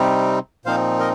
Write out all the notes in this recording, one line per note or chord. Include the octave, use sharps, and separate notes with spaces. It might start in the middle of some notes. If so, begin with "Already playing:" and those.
Already playing: C3 G3 C4 D#4
A#2 F3 C4 D#4 C5 F5
A#4 D#5